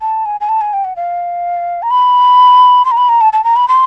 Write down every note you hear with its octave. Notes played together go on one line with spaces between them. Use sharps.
A5
G#5
G#5
A5
G#5
G5
F#5
F5
A#5
B5
C6
A#5
B5
A#5
A5
A5
A#5
B5
C6